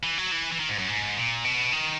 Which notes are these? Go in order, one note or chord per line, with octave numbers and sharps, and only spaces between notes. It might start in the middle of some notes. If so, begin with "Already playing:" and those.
E3
F#3
E3
E3
D#3
G#2
F#2
G#2
A#2
B2
D#3